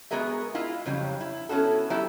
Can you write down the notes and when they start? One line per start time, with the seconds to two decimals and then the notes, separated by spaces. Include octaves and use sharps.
0.11 G#3 B3 F#4 G#4 A#4 E5
0.55 G#3 E4 F4
0.86 F2 C#3 F#3 G3
1.21 E4
1.49 B3 C#4 E4 F#4 A4
1.90 F#3 B3 E4 G4 E5